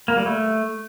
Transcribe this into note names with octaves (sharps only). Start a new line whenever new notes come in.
A#3
G3
A3